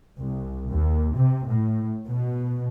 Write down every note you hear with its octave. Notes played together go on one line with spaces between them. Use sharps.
C2
D#2
C3
A2
B2